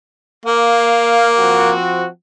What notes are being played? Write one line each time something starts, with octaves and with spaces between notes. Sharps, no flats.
A#3 F5
F3 C4 F#4